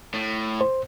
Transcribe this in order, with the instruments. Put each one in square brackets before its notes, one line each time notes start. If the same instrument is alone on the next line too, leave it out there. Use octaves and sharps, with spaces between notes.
[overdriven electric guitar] A2
[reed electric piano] C5